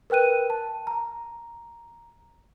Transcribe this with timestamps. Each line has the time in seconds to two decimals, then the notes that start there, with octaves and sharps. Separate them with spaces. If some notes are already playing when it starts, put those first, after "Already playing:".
0.10 A#4 B4 G5 F#6 D#7
0.50 A5
0.87 A#5